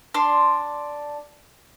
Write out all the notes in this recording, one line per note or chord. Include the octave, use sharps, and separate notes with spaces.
D4 C6